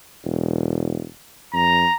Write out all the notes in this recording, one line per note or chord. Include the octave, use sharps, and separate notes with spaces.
E1
F2 A#5